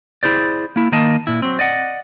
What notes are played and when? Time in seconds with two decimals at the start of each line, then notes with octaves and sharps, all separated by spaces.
0.23 E4 G#4 C5 D5
0.76 A#3 E4
0.92 D#3 A#3 D#5 A5
1.27 A#2 E4
1.42 F#3 C4
1.59 D5 D#5 F#5